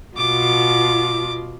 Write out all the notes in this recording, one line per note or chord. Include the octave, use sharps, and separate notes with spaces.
B2 F4 D6